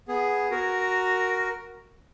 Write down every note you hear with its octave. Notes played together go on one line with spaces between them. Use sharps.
B3 G#4
F#4 A#4